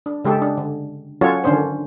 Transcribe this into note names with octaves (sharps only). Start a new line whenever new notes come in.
D4
C#3 G#3 G4 A4
D4
D3
F#3 C#4 F4 F#4 A4 C#5
D3 D#3 C#4 D4 C5